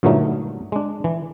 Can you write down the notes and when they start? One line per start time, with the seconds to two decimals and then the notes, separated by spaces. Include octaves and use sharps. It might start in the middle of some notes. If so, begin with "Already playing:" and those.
0.03 G2 A#2 D3 F#3 A3 D#4
0.72 G#3 D4
1.04 E3